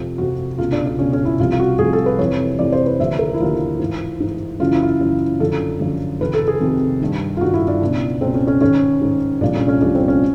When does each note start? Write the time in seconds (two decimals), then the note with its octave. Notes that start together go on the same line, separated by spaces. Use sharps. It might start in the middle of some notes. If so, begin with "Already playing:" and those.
Already playing: F2 C3 F3
0.18 F2 C3 F3 F#4
0.58 C#2 B2 F4
0.72 D4
0.86 D4
0.99 C#2 B2 C#4
1.13 C#4
1.25 E4
1.39 C2 C3 F3 F4
1.52 F4
1.60 F#4
1.79 C2 C3 F3 G#4
1.93 A4
2.06 B4
2.19 F2 C3 E3 C#5
2.59 F2 C3 E3 D5
2.72 C5
2.86 B4
2.99 D#2 D3 F3 E5
3.19 A#4
3.34 E4
3.40 D#2 D3 F3 F4
3.79 G#2 E3
4.20 G#2 E3
4.59 F#2 C#3 E3 F4
4.72 E4
4.83 F4
5.01 F#2 C#3 E3
5.40 F#2 D3 F3 A4
5.80 F#2 D3 F3
6.20 F2 C3 D#3 B4
6.34 A4
6.48 G#4
6.60 F2 C3 D#3
7.01 G2 D#3
7.37 F4
7.41 G2 D#3 F#4
7.54 E4
7.68 D4
7.82 C#2 B2
8.21 C#2 B2 C4
8.34 C#4
8.47 C#4
8.61 G#2 D#3 C#4
9.01 G#2 D#3
9.41 C2 A#2 F3 D4
9.55 C#4
9.68 C#4
9.81 C2 A#2 F3 D4
9.95 C4
10.08 C#4